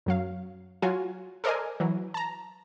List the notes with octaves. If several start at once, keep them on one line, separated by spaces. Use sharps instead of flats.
F#2 F#3 F5
F#3 F4 F#4 G#5
A4 A#4 C5 D5 D#5 G#5
E3 F#3
A5 A#5